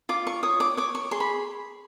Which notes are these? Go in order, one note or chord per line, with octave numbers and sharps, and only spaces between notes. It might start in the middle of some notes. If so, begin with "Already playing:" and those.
F4 D6
C#6
C#5 D#6
D6
C#5 D6
C#6
G#4 C6
B5